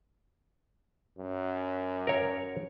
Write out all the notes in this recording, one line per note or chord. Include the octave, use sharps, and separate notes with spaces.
F#2
A#4 C#5